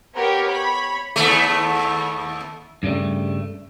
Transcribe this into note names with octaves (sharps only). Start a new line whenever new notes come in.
B3 G4 A#4 C#5
C#5 B5
D#2 A3
G2 C#3 G3 A3